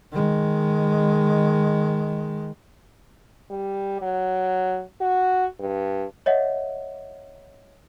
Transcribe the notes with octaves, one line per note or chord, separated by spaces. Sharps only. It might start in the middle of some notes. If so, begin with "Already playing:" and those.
D#3 G#3
G3
F#3
F#4
G2
C#5 D#5 E5 F#5